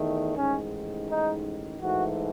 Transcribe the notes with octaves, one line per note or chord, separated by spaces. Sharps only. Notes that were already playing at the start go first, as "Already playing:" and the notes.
Already playing: E2 D#3 A3
A1 G#2 D#3 C#4
D#4
G#2 E3 A3 F#4